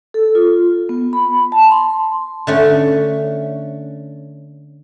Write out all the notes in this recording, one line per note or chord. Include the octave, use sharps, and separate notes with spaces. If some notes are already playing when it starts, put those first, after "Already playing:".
A4
F4
B3
B5
A5
C6
D3 A3 C#4